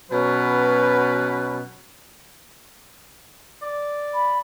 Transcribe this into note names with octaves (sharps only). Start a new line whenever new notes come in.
B2 F#3 C#4 B4
D5
B5